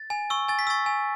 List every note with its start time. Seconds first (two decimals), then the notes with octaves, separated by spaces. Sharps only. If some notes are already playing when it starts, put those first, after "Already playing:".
Already playing: A6
0.10 G#5
0.30 C#6 E6
0.48 G#5 A6
0.59 B6
0.67 C#6 E6 A6
0.86 G#5